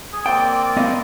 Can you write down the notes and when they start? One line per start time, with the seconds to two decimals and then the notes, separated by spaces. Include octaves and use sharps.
0.13 G#4
0.26 A#3 C4 D5 G5
0.77 B3 D#5 F5